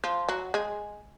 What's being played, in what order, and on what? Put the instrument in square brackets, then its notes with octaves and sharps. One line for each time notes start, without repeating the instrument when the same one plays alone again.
[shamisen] F3 F4
F#3 F#4
G#3 G#4